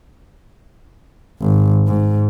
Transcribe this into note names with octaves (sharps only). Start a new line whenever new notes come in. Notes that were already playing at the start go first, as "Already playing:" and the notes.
G#1
G#2